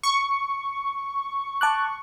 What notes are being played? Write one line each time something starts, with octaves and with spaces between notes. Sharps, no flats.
C#6
A5 D6 F#6